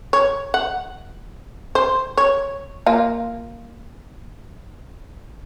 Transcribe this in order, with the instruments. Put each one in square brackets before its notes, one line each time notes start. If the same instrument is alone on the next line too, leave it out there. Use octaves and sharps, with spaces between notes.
[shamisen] C#5
F#5
C5
C#5
A#3 F4